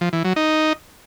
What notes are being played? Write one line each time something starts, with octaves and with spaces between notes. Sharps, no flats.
F3
E3
F#3
D#4